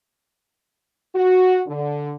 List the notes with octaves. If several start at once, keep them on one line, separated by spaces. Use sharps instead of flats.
F#4
D3